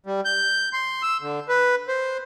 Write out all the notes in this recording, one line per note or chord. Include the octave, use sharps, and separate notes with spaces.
G3
G6
C6
E6
D3
B4
C5